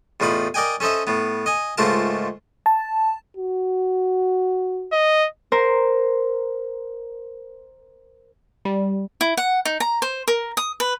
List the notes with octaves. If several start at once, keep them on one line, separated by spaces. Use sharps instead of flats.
E2 A2 D#4 F4 B5
A#4 D5 D#5 G5 G#5
C#4 A4 C5 D#5 E5
A2 B3
D#5 G#5
C#2 G#2 A3 F4 A#4 A5
A5
F#4
D#5
A#4 C5
G3
E4
F#5
D#4
A#5
C5
A#4
D#6
B4